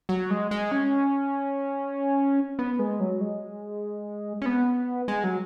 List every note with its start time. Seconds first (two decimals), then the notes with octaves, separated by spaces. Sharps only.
0.09 F#3
0.31 G#3
0.51 G#3
0.72 C#4
2.59 B3
2.79 G#3
3.00 F#3
3.21 G#3
4.42 C#4
4.46 B3
5.08 G#3
5.24 F#3